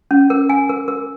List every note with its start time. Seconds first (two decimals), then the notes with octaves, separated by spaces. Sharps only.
0.11 C#4
0.30 A#4
0.49 G#5
0.69 A#4
0.88 A#4